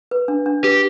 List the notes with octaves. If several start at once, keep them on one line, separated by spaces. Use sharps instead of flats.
B4
D4
D4
G4 B4